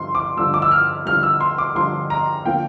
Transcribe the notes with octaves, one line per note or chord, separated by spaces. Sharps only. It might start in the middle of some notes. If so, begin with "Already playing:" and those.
Already playing: G2 D3 F3 C6
D6
G2 D3 F3 E6
D6
E6
F6
G2 D3 F3 F6
E6
C6
D6
G2 D3 F3 C6
A#5
D3 F3 A#3 G5